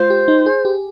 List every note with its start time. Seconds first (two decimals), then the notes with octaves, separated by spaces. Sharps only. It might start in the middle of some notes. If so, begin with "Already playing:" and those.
Already playing: G#3 F4 C5
0.10 G4
0.28 D#4
0.46 G#4
0.65 G4